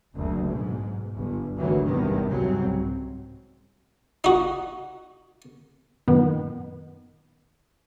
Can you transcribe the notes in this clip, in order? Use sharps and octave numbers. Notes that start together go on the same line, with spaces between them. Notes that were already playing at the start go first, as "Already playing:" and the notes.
F#1 D2
B1 G#2
G1
G#1 D2 G#2 D#3 E3 F#3
G#1 E2 G2 C3 D#3 B3
C2 G#2 C#3 F#3 C4
D#4 F#4
F#2 A#2 D#3 B3